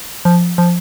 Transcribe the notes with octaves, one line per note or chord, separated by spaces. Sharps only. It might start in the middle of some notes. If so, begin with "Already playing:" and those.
F3
F3